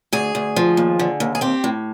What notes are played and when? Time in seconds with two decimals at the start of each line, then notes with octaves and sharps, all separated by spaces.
0.13 D2 G#4
0.35 D2
0.56 F3
0.77 D#2
0.99 D3
1.20 D#2
1.35 G#4
1.41 C4 G4
1.64 A2